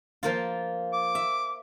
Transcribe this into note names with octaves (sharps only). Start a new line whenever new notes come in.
F3 A#3 F4
D6
E5